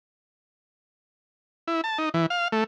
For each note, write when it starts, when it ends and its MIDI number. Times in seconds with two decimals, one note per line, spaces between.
1.68 1.81 64
1.84 1.98 81
1.98 2.09 63
2.14 2.26 52
2.30 2.48 77
2.52 2.64 57